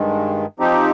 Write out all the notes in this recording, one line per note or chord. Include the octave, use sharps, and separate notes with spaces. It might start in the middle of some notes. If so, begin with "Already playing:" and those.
Already playing: G2 D#3 G#3
F3 C4 D#4 G4